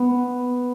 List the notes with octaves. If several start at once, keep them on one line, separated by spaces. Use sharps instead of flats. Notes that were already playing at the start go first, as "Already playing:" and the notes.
Already playing: B3